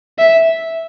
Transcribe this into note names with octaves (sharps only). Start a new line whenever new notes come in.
E5